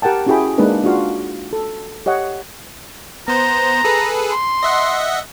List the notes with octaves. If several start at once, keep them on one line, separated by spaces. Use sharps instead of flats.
G4 A#4 F#5 G5 A5
C#4 E4 F#4 G#4 G5 B5
G#3 A#3 D4 D#4 B4
D4 F4 F#4 F5
A4
G4 C#5 D#5 F#5
B3 C5 A#5
G#4 A4 B4
C6
D#5 E5 F#5